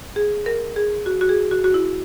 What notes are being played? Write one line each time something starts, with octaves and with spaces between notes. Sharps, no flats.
G#4
A#4
G#4
F#4
F#4
G#4
F#4
F#4
E4